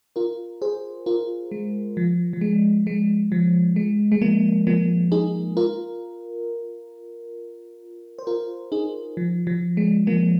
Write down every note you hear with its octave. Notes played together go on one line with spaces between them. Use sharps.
F4 A#4
G#4 C5
F4 A#4
G#3
F3
F3
G#3
G#3
F3
G#3
G#3
F3 A#3
F3 A#3
D#4 G#4
F4 A#4
C5
F4 A#4
D#4 G#4
F3
F3
G#3
F3 A#3